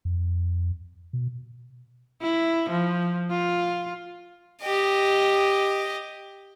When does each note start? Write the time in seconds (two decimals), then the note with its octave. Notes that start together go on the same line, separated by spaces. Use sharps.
0.05 F2
1.13 B2
2.21 E4
2.70 F3
3.30 F4
4.62 G4 D#5